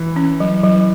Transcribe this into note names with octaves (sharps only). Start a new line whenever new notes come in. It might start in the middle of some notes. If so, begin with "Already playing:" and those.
Already playing: E3
C#4
F#3
F#3